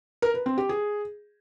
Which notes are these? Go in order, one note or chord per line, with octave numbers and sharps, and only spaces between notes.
A#4
B4
C4
G4
G#4